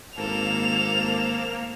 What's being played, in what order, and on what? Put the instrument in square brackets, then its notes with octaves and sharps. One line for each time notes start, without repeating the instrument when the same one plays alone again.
[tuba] G#1 [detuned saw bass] A#3 [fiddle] A4 C5 [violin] F7